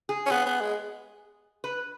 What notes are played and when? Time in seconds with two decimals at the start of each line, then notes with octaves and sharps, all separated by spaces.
0.09 G#4
0.26 C#4
0.31 B3 G#4
0.46 B3
0.61 G#3
1.64 B4